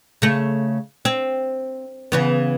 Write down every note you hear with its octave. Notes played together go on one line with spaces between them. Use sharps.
C#3 A3
C4
C#3 E3 B3